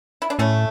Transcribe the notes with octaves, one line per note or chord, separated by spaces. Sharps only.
E4
D4
A2 A3 C#4